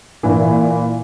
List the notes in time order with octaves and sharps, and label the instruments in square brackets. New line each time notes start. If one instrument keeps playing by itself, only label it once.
[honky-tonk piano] A#2 E3